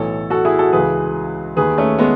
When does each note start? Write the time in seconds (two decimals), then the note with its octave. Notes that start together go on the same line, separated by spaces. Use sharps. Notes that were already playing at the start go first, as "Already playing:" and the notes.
Already playing: B1 A2 E3 A4 C#5
0.30 F#4 A4
0.45 E4 G#4
0.59 F#4 A4
0.72 C#2 C#3 E3 G#4 B4
1.56 D#2 D#3 G#4 B4
1.78 A3 C#4
1.98 G#3 B3